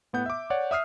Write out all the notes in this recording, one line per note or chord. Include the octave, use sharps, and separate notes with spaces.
A2 B3 F#5 G6
E5 D6
C#5 D5 F#5
E5 D#6 F6 C7